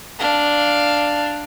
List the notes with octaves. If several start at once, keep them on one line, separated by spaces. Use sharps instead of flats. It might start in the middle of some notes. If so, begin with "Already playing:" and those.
D4 F5